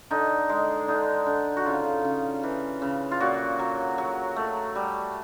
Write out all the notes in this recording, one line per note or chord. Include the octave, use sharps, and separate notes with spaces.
D3 D#4
G#3
D3 D#4
D3
F#4
C#3 F4
C#3
E3
C#3
F4
A#2 F#4
F#3
F#3
A3
G3